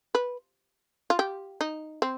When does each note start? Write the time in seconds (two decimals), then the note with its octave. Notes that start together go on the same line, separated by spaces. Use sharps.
0.15 B4
1.10 F4
1.19 G4
1.61 D#4
2.02 C4